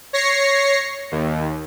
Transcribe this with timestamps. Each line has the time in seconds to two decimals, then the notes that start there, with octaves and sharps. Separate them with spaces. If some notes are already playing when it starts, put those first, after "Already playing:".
0.13 C#5 A#6 C7 C#7
1.12 D#2